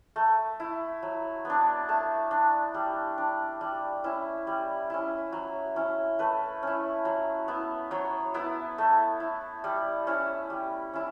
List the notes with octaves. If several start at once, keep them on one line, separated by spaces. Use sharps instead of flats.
A3
E4
F#3
B3 D4
A3 A5
D4
G3
D4
G3
C#4 E4
G3
C#4 E4
F#3
C#4 E4
A3 B4
C#4 E4
F#3
B3 E4
F#3 C#5
B3 E4
A3
E4
G3
C#4 E4
G3
C#4 E4